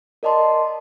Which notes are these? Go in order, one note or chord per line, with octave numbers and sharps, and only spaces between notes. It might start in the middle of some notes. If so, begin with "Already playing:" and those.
A#4 D5 D#5 A5 C6